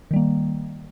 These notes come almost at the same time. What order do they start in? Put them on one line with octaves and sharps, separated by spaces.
D#3 G3 A#3